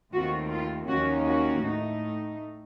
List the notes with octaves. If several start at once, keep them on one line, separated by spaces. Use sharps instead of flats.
D#2 D#3 A3 C4 F4 F#4
F4
D#2 D#3 A#3 C#4 F#4
F#4
A2 A3 D#4